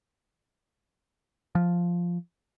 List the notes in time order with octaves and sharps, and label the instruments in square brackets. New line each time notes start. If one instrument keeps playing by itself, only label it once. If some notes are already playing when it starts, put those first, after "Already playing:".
[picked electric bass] F3